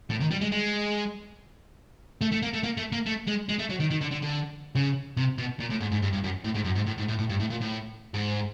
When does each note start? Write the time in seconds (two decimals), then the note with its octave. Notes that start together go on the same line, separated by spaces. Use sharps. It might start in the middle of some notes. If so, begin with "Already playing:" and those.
0.10 A2
0.20 D#3
0.31 G3
0.41 G#3
0.52 G#3
2.21 A3
2.32 A3
2.43 A#3
2.54 A3
2.64 A#3
2.77 A3
2.92 A#3
3.06 A3
3.27 G#3
3.49 G#3
3.59 A3
3.70 F#3
3.80 D#3
3.91 D#3
4.01 D3
4.12 D3
4.23 D3
4.75 C#3
5.17 C3
5.38 B2
5.60 A#2
5.71 A2
5.81 G#2
5.92 G#2
6.02 G2
6.13 G2
6.24 F#2
6.45 A2
6.55 G#2
6.66 F#2
6.76 G#2
6.87 A2
6.98 G#2
7.08 A2
7.19 A2
7.30 G2
7.40 A2
7.51 A#2
7.61 A2
8.14 G#2